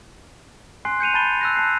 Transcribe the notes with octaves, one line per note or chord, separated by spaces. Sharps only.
G#5 C6 F#6 C7
G6 C#7 D#7 F7
A5 B5 A6 D#7 G7
E6 F#6 A#6
A5 F#6 C7